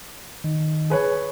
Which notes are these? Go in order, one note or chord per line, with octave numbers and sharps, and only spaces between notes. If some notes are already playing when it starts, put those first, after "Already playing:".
D#3
G#4 B4 C#5